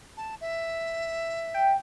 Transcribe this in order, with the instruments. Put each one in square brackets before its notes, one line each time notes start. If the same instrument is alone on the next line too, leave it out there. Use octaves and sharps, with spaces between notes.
[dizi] A5
E5
[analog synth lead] G5